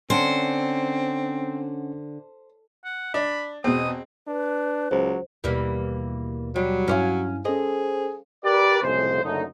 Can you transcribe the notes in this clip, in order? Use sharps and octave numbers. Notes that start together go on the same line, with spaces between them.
D3 C4 C#4 C5 F#5 C#7
F#5
D4 B5
E2 B2 C4 D#6
D4 B4
C#2 F#3 C5
D#2 B2 E3 G3 A#3
F#3 G3
G2 C#4 E4 C#5 F5
C#4 G#4 A4 C5 D#5
G4 A#4 B4 D5
C2 F2 A2 C#3 G#3 C5
F#1 F#2 D3 A3 D#4